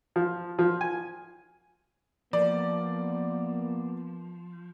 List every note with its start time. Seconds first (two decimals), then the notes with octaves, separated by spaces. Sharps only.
0.16 F3
0.59 F3
0.81 G#5
2.33 F3 A#3 B3 D5